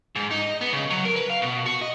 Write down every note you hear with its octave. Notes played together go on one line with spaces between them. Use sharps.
G#2
D#4
D#5
B3
C#3
F#3
A#4
B4
F5
B2
F#4
D#5